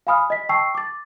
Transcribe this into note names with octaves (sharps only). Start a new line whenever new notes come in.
F5 G#5 B5 D#6 F6
D#5 B6
G5 A5 C#6 E6 C7
D6 A6